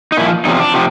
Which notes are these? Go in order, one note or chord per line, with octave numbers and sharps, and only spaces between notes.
D#4
A#2 F3 E4
E2 C3 F3 D#4
D4
C3 F3